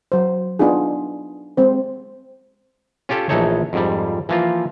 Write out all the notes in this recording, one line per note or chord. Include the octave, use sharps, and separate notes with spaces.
F#3 C5
B3 D4 D#4 F4 G#4
G#3 C4 C5
C#4 F4 G4 A4 C#5
A#1 E3 A3 D#4 A4 C#5
F2 G#2 G3
E3 F3 A#3 F4